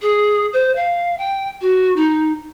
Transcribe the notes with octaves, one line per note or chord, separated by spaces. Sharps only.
G#4
C5
F5
G5
F#4
D#4